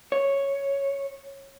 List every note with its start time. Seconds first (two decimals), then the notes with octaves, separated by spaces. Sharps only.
0.12 C#5